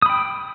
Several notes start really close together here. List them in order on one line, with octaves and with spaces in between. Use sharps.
D#6 B5 G5